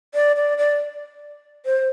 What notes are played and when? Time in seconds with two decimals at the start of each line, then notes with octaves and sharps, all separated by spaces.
0.15 D5
0.36 D5
0.58 D5
1.66 C5